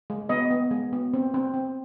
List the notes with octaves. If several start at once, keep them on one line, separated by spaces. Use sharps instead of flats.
G#3
B3 D#5
B3
G#3
B3
C4
C4
C4